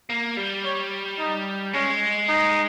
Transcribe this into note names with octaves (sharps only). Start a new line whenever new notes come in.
A#3
G3
C#5
D#4
G#3 C#4
D#4